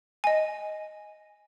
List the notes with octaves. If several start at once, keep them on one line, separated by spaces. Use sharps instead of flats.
D#5 G#5